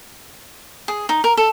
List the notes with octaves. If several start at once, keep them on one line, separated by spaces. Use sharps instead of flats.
G#4
D#4
A#4
A4